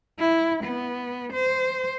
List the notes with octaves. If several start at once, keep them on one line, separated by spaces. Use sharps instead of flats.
E4
B3
C5